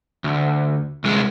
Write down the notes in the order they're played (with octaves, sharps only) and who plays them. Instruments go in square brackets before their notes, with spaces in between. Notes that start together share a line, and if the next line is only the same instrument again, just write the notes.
[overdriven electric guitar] D2
C2 G#3